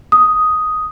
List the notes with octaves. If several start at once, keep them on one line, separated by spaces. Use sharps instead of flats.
D#6